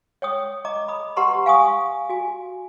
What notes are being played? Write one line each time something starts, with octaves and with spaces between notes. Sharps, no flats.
C#5 G5 D#6
D#5 A#5 D6
B5 D#6
G4 B4 F#5 A#5 C6 C#6
F5 G#5 C#6 D#6
F#4 G#5